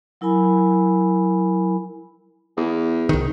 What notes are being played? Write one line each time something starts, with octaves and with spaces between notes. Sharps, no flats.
F#3 E4 A#4 G#5 B5
E2
C2 D#3